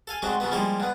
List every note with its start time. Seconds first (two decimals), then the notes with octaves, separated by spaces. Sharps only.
0.07 A4 F5 G#5
0.22 D3 F#3 G#3 A3 C4
0.40 C#3 F#3 A3 B3
0.52 F3 G3 G#3 A#3 E4 G4
0.80 D3 B3